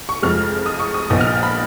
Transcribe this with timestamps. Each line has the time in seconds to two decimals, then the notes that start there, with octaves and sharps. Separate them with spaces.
0.09 C#6
0.22 F1 F2 F3 G#3 F6
0.66 D#6
0.80 C#6
0.94 D#6
1.10 A#1 A#2 F3 B3 D#4 D#6
1.21 F6
1.43 B5